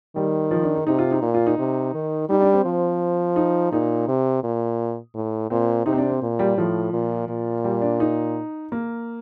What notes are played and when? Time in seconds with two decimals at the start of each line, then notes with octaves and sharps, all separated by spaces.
0.16 D#3 G3
0.51 F3
0.63 D4
0.75 D#4
0.87 C3 D#4
0.99 F4
1.11 D#4
1.22 A#2
1.34 F4
1.47 D#4
1.59 C3
1.94 D#3
2.30 G3 D#4
2.42 D4
2.53 C4
2.66 F3
3.36 D#4
3.72 A#2 D#4
4.08 C3
4.44 A#2
5.15 A2
5.50 A#2 C4
5.86 C3 D#4
5.93 C4
5.98 D4
6.10 C4
6.22 A#2
6.39 G3
6.57 A2 F3
6.93 A#2
7.29 A#2
7.64 G3
7.82 D4
8.00 D#4
8.72 A#3